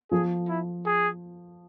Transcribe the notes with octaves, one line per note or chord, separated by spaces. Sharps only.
F3 G#4
E4
G#4